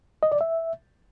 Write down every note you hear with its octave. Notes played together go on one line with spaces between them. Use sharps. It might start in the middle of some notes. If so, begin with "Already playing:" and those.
D#5
D5
E5